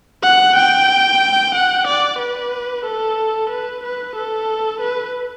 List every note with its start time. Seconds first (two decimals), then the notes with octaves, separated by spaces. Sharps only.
0.22 F#5
0.56 G5
1.54 F#5
1.87 D5
2.18 B4
2.85 A4
3.49 B4
3.83 B4
4.15 A4
4.80 B4